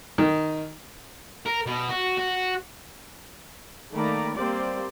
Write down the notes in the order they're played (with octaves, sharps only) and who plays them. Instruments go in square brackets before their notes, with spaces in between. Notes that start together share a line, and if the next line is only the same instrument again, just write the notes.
[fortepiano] D#3
[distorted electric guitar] A#4
B2
F#4
F#4
[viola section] D#3 A3 A#3 D5 A#5 B5
G3 A#3 C4 G4 C5 D5